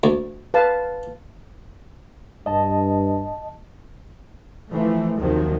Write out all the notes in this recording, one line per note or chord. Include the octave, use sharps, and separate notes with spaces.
D2
B4 F5 A5
G2 D#5 A5
E3 F3 A3
D#2 C3 D#3 F3 F#3